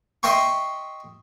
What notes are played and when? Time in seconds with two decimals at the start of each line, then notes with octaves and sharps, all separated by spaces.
0.23 D#5 E5 G5 C6 C#6